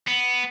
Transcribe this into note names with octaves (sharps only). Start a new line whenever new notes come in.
B3